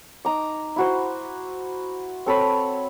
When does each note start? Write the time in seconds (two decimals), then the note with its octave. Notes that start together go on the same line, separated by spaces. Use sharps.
0.25 D#4 A#5 D6
0.76 E4 F#4 C5
2.26 C4 A4 C#5 B5